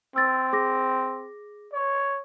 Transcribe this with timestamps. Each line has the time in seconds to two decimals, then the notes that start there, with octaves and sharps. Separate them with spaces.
0.16 C4 E6 A6
0.53 G#4 D6 A#6
1.73 C#5